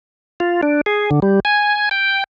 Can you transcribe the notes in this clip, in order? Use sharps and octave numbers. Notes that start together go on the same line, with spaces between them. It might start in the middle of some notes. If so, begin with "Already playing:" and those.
F4
D4
G#4
D3
G3
G#5
G5